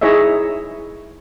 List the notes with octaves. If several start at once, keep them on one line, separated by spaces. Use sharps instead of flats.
D#4 E4 G#4 C#5 D#5 E5